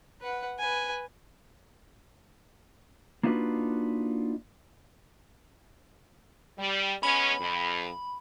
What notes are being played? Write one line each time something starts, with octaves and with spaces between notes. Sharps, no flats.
B4 F#5
B4 G#5
A#3 D4 D#4 F4 F#4 B4
G3
G#3 B3 C#4 B5
F2